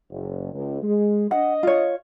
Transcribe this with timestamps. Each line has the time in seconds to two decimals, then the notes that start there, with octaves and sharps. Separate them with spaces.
0.10 F#1
0.53 C#2
0.82 G#3
1.31 D4 D#5 F#5
1.63 F4 C#5